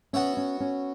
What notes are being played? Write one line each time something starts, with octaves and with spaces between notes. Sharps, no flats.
B3 C#4 F#4 C#5 E5
C#4
C#4